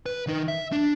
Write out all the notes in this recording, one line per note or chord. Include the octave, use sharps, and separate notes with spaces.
B4
D#3 D#4
E5
D4